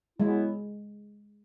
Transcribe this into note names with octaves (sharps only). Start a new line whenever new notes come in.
F#3 G#3 B3 E4